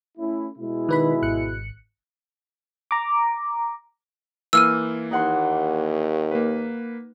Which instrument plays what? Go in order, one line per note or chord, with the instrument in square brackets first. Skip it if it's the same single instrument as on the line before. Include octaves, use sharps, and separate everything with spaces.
[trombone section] A3 C#4 E4
B2 G#3 E4
[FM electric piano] D#3 B4 B5
G#1 F#6 C#7
A#5 D6
[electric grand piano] E3 A#3 F4 [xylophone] E6 F6 D#7
[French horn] D#2 [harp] D#4 F#5 C6
[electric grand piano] A#3 B4